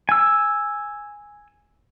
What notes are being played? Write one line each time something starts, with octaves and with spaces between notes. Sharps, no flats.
G#5 E6